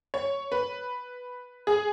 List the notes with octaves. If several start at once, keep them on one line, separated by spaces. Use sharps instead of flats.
C#5
B4
G#4